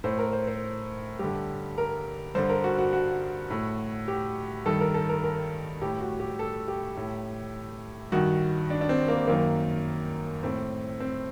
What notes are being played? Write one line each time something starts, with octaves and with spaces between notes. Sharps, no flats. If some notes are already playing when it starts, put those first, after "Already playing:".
A2 C5
A#4
C5
C5
G2 D3 G4
A#4
G2 D3 C5
A#4
F#4
F#4
F#4
A2
G4
G2 D#3 A4
A#4
A4
A#4
A#4
A2 G4
F#4
G4
A4
G4
A2
G2 D#3 F#4
D4
D4
C4
A#3
F#2 D#3 A#3
A2 C4
C4